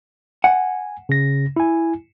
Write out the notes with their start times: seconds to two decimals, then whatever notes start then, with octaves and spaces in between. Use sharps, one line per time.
0.44 F#5 G#5
1.09 C#3 A#6
1.56 E4 G#5